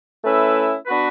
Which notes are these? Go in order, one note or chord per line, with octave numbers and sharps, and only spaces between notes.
A3 C#4 E4 B4 E5
B3 D4 F#4 B4